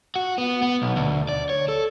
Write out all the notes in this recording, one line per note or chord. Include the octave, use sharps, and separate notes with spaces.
F#4
B3
B3
B1
D2
D5
C#5
A4